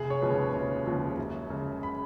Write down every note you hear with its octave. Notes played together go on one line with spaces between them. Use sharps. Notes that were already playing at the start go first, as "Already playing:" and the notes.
Already playing: F1 G#4
C#5
D#2 C#3 F3 G#3 B4
F1 C#5
D#2 C#3 F3 G#3
F#2
C#3 G#3
B5